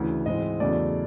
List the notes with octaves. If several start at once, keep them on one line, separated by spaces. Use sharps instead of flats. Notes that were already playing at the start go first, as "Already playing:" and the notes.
Already playing: D2 C#3 E3
G#2 E3 G#3 C4 D#5
E2 C#3 F#3 A3 D5